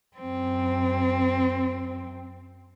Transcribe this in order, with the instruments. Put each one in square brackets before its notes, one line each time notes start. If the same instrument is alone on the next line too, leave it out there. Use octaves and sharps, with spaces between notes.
[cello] F#2 C4